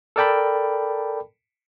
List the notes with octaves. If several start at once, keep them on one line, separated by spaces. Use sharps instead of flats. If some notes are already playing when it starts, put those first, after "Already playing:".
A4 A#4 D5 G5 A5 B5